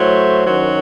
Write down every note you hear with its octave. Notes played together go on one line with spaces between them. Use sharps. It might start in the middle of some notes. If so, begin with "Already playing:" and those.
Already playing: A2 F#3 A3 C5
F#2 D#3 F#3